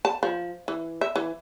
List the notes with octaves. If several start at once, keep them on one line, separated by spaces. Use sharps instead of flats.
A5
F3
E3
E5
E3